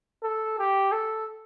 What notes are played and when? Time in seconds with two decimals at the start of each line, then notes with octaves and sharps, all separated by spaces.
0.23 A4
0.59 G4
0.92 A4